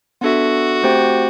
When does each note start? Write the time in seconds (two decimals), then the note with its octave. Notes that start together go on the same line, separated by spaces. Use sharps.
0.21 B3 D4 F#4 A4 E5
0.83 A3 C4 G4 C5 G5